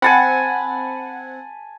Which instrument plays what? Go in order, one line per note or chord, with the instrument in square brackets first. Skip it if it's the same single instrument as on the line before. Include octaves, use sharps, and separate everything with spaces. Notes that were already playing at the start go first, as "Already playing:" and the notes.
[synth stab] C4 F#5 [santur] G#5 A5 B5